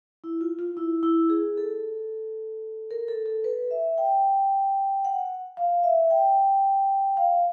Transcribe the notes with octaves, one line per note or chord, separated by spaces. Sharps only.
E4
F4
F4
E4
E4
G#4
A4
A#4
A4
A4
B4
E5
G5
F#5
F5
E5
G5
F5